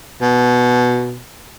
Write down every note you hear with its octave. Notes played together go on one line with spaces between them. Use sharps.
B2